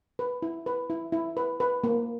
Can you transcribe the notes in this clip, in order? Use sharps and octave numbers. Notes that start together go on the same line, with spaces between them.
B4
E4
B4
E4
E4
B4
B4
A#3